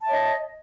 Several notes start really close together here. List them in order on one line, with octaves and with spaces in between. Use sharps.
A5 E5 C#5 D#5